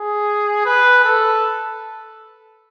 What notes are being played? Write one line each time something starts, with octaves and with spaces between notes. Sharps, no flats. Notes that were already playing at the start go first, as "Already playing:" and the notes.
Already playing: G#4
B4
A4